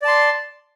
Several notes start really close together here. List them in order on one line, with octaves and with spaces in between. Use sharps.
D5 A5 C6